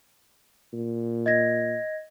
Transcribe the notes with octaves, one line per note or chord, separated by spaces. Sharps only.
A#2
D#5 G#6 A#6